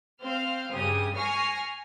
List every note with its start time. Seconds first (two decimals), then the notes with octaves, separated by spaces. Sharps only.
0.22 C4 C5 F5 F6
0.73 G2 C#3 G4 G#5 D#6
1.14 G#5 C#6 F6 A#6 C7